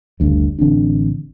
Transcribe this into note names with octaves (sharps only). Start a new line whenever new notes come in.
F#1 D2 G2
A1 D3 C4 D4